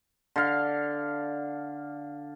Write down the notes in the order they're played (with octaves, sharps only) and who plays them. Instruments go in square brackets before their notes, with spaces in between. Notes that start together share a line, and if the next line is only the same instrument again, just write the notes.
[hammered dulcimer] D3 F5